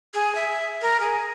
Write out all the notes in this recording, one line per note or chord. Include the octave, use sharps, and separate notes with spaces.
G#4
E5
A#4
G#4